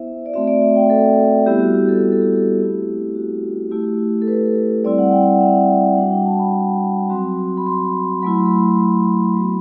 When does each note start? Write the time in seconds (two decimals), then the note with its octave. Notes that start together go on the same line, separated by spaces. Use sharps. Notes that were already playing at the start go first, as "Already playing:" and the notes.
Already playing: B3 E4 C5 E5
0.26 D5
0.34 A3 C4 F#4 E5
0.47 D5
0.62 E5
0.76 G5
0.90 A4
1.46 G3 B3 E4 G4
1.60 F#4
1.75 G4
1.89 A4
2.03 G4
2.12 A4
2.22 G4
2.59 A3 C4 E4
3.15 F#4
3.71 A3 E4 G4
4.22 A4
4.28 B4
4.84 G3 C4 E4 D5
4.98 F#5
5.12 G5
5.27 F#5
5.40 E5
5.97 G3 D4 F#4 F#5
6.11 G5
6.25 A5
6.39 B5
7.09 F#3 C4 F#4 C6
7.57 B5
7.66 C6
8.22 F#3 A3 E4 B5
8.34 C6
8.46 B5
9.35 F#3 B3 F#4